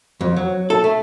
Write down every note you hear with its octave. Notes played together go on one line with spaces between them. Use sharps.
F2
F#3
A4
A3